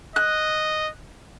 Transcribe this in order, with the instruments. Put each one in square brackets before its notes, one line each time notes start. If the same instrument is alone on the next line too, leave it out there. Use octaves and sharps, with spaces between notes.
[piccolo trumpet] D#5 [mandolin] F#6